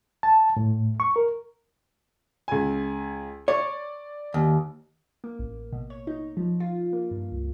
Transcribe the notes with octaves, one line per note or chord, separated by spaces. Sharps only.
A5
A2
C#6
A#4
C#2 G#5
C#5 D5
D#2
A#3
A1
B2
C#5
D#4
F3
F4
A#3
G2
C#2